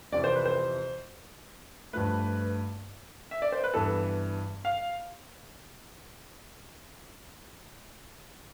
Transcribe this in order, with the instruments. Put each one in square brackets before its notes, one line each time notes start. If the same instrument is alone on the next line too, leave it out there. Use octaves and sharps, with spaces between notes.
[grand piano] F2 C3 E3 D5
C5
B4
C5
G2 F3 A3 B4
E5
D5
C5
B4
G2 E3 B3 A4
F5